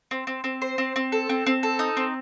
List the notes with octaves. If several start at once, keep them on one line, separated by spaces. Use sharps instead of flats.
C4
C4
C4
C5
C4
C4
A4
C4
C4
A4
D#4
C4